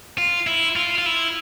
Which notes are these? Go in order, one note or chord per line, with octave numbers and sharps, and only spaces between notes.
F4
E4
F4
F4
E4